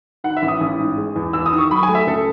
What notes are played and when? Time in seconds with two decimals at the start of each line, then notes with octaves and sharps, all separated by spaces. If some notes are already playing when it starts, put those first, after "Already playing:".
0.24 D#3 F#5
0.37 E5
0.42 A1
0.48 D#6
0.61 A1
0.78 G#2
0.97 G#3
1.16 E2
1.33 E2 E6
1.46 D#6
1.53 D#3
1.58 C#6
1.71 F#3 B5
1.83 G#5
1.89 A3
1.95 E5
2.07 C#2 A4